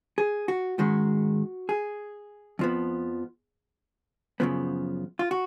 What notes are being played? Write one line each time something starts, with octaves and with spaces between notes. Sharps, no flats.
G#4
F#4
G#2 D#3 G#3 C#4 F#4
G#4
F2 F3 B3
F#2 C#3 F3 B3
F4
F#4